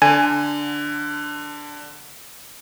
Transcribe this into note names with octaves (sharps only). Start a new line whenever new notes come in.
D3 G#5